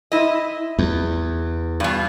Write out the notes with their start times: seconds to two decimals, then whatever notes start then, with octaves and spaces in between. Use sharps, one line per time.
0.12 E4 D#5
0.79 E2
1.80 G2 B2